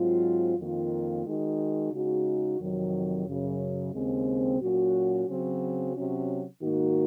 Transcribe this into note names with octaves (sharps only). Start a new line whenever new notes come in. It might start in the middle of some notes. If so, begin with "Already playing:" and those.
Already playing: G#2 F#3 C4 F4
F2 D#3 A#3 F4
D#3 G#3 D#4 F#4
C#3 G#3 D#4 F#4
F2 C3 D#3 F#3
F#2 C#3 F#3
D#2 C#3 G#3 C4
A#2 F#3 C#4 F#4
C#3 F#3 C4 F#4
C3 F#3 C#4 F#4
G#2 D#3 A#3 D#4 F#4